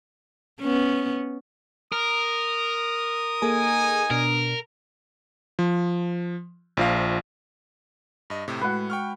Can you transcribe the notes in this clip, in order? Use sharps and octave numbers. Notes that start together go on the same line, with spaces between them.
B3 C#4
A#4 D#6
A#3 D#4 G#4 A4 G#5
B2 D4 A#4
F3
A#1 F3 F5
G2 D#5
A2 C3
A2 G#3 F#4 B4 F#5
G5 C#6 F6